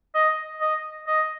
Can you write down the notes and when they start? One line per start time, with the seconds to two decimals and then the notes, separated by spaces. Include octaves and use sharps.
0.15 D#5
0.61 D#5
1.07 D#5